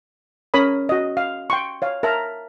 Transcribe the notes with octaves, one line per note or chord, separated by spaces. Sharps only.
C#4 A#4 C#5 B5 D#6
F#4 D#5
F5
G5 C6 C#6
C#5 F5
A#4 E5 A5 A#5